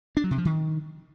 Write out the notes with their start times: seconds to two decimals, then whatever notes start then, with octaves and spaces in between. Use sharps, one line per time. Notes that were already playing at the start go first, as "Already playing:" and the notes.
0.17 D4
0.24 F#3
0.31 C3
0.38 F3
0.45 D#3